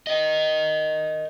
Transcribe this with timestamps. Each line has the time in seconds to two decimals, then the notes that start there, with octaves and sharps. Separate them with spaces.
0.07 A#4 D#5